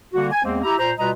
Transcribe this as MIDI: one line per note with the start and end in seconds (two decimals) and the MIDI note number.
0.14 0.28 50
0.14 0.28 55
0.14 0.28 58
0.14 0.28 66
0.32 0.43 80
0.44 0.60 40
0.44 0.60 56
0.44 0.60 58
0.44 0.60 60
0.64 0.78 64
0.64 0.78 67
0.64 0.78 82
0.79 0.91 46
0.79 0.91 72
0.79 0.91 82
0.99 1.11 47
0.99 1.11 55
0.99 1.11 65
0.99 1.11 71
0.99 1.11 75
0.99 1.11 82